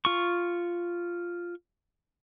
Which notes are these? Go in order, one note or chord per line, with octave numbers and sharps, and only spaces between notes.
F4 C#6